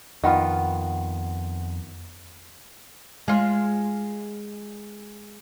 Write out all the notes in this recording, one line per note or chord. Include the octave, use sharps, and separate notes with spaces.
F2 D#3 B3 F4 F#5
G#3 F4